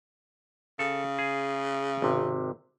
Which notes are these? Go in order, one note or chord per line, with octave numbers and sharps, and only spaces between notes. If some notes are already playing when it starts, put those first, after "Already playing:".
C#3 A4
G#4
G#1 C3